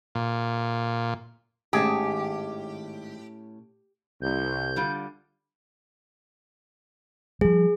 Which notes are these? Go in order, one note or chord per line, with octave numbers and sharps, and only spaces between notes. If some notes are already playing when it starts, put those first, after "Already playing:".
A#2
G#1 A2 C#4 G4 G#4 A5
C2 G6
D3 G3 F4
F3 G3 G#4